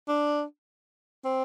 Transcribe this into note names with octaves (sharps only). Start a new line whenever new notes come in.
D4
C4